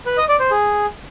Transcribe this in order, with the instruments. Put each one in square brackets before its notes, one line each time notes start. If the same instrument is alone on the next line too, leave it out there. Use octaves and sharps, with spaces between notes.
[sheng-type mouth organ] B4
D#5
D5
C5
G#4